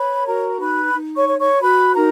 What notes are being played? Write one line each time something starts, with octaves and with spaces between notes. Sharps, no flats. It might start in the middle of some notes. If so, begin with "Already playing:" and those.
Already playing: B4 C#5 B5
F#4 A#4 A#5
D#4 B4 B5
D#4
C#5 C#6
C#5
C#5 C#6
F#4 B4 B5
D#4 A#4 A#5